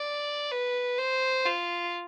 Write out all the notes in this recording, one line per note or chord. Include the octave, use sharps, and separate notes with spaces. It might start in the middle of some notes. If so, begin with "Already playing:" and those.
Already playing: D5
B4
C5
F4